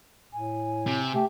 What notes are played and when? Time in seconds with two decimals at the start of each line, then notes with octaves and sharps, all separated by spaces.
0.33 A2 G#5
0.87 C3
1.14 A3 G4